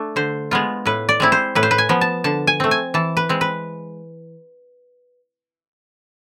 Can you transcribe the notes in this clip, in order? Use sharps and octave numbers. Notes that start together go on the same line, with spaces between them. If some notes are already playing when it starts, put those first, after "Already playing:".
Already playing: A3 D4
D3 C5
G#3 B3 F4
A2 B4
D5
G#3 C4 E4
C5
A2 B4
C5
B4
G#5
F3 B3
A5
D3 A5
G#5
A3 C4
G#5
E3 A5
B4
G#3 C4
B4